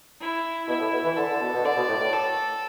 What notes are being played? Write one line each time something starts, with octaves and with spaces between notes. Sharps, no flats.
E4
B2 E4
A2
B2
E3
D3 A4
D3
B2
B2
D3 D5
B2
A2
A2
A4